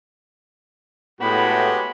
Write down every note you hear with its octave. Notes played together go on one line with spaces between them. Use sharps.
A2 G#3 B3 F#4 G4 B5